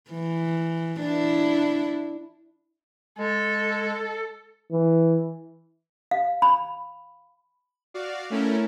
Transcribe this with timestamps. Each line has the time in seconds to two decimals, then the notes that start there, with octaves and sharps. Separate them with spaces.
0.11 E3
1.00 D4 E4
3.19 G#3 A4
4.71 E3
6.11 F5
6.42 B5
7.94 F#4 D5 F5
8.30 A3 C#4 E4 A4 A#4